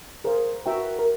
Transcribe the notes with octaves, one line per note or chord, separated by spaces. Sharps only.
G#4 A#4 C5 F5
F#4 B4 E5 G5 A#5
A#4